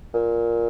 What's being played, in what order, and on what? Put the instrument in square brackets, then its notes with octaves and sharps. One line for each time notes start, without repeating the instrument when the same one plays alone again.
[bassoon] A#2